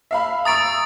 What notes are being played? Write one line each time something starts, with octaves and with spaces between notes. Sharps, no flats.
E5 F5 B5
A#5 C#6 D#6 E6 A6 D7